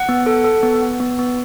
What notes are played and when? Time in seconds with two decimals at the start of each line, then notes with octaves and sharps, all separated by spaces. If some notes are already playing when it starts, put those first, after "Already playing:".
Already playing: F#5
0.09 B3
0.26 A4
0.44 A4
0.63 B3
0.82 B3
1.00 B3
1.19 B3